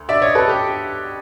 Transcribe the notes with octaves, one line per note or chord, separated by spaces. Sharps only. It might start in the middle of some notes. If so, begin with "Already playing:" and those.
Already playing: D2
D5 E5
C#5 D#5
A4 B4
G4 A4